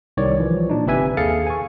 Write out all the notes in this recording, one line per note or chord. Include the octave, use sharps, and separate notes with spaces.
C2 D#3 C#5 D5
E3 F3
A#2 D4 D#4
G1 C3 G4 B4 E5 G#5
D#2 G#4 A4 F5 A6 C#7
G#5 C#6